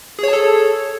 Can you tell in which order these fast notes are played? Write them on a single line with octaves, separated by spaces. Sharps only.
G#4 C#5 A5 A4